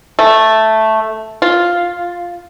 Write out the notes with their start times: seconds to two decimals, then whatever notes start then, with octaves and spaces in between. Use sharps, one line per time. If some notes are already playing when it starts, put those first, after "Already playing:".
0.19 A3
1.42 F4